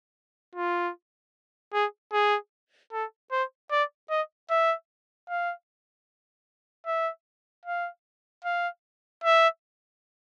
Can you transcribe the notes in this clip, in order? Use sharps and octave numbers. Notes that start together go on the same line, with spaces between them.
F4
G#4
G#4
A4
C5
D5
D#5
E5
F5
E5
F5
F5
E5